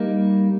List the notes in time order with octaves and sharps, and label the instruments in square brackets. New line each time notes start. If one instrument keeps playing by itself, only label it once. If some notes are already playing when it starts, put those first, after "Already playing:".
Already playing: [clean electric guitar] G3 A#3 D#4